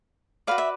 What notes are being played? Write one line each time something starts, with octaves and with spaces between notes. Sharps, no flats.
F#4 B4 D5 F5
E5